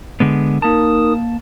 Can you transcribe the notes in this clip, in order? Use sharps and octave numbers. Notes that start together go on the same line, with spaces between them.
D3 G#3 B3
A#3 D#4 A#4 A5 D#6